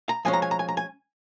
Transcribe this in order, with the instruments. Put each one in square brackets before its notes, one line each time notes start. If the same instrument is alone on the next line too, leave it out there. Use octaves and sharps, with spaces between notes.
[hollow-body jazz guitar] A#5
F3 G#3 C#4 G#5
A#5
G#5
A#5
G#5
A#5
G#5